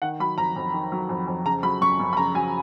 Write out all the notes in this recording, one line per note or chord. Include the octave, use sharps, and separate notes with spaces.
D#3 F#5
F#3 B5
F2 A#5
F2
D#3
F#3
F2
F2
C#3 A#5
F#3 B5
F#2 C#6
F#2
B5
C#3 A#5
F#3 G#5